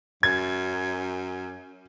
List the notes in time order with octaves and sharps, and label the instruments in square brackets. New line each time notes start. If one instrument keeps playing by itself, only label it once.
[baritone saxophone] F#2 [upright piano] G#6